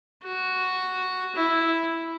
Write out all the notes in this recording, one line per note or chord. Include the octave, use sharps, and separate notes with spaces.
F#4
E4